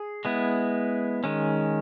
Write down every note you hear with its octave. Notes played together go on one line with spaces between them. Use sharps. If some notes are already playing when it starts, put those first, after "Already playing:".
Already playing: G#4
G#3 B3 E4
D#3 G#3 C#4